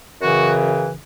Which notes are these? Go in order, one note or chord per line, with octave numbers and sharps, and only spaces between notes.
F#2 C#3 E3 F#4